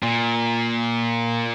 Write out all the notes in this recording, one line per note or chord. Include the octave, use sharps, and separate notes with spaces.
A#2